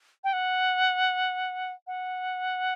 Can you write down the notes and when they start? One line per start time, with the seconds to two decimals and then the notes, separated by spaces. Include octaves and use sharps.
0.24 G5
0.33 F#5
1.87 F#5